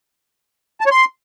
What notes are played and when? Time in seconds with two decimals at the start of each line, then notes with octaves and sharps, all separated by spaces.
0.81 A5
0.86 C#5
0.91 C6